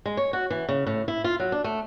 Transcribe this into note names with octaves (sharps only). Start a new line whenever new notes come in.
G#3
C#5
F#4
E3
C#3
A2
E4
F4
F#3
D4
A3